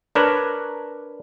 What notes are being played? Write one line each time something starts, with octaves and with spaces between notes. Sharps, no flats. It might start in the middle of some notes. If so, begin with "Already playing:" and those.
D4 A#4 B4 C#5